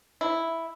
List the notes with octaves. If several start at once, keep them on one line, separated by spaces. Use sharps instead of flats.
E4